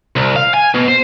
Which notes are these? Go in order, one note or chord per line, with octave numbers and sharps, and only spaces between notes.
C2
F5
G#5
B2
C5